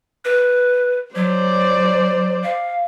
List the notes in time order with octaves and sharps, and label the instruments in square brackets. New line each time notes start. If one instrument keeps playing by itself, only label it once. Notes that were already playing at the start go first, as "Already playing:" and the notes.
[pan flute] B4
[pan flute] F#3 [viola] C5 D5
[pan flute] F5